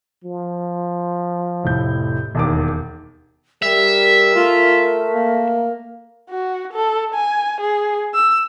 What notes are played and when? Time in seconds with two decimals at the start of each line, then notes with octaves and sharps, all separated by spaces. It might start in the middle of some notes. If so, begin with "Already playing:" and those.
0.24 F3
1.64 F1 A2 G6
2.35 E1 D#2 D6
3.62 G3 A#4 E5
4.36 A3 F4
5.13 A#3
6.30 F#4
6.73 A4
7.14 G#5
7.61 G#4
8.14 E6